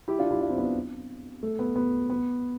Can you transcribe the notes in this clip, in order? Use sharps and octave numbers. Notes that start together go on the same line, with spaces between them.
E4 G4
D4 F4
E4 G4
D4 F4
C4 E4
B3 D4
A3
B3
B3
B3